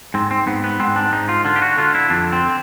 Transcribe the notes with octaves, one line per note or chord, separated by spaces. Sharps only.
G#2 C4
C4
G#2 B3
B3
G#2 C4
D4
G#2 D#4
F4
D3 F4
G4
F#4
D3 F4
E4
F2 D4
C4